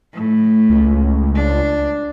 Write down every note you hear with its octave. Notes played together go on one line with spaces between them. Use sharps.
A2
C#2
D4